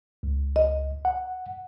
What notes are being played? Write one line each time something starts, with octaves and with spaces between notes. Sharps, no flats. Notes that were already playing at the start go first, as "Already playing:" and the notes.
C#2
D#5
F#5